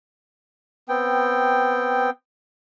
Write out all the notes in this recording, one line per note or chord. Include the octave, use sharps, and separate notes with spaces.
B3 C4 G5